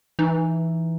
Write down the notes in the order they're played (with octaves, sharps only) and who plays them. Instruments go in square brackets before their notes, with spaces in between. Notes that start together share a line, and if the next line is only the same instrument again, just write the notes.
[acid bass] E3 [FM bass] D#4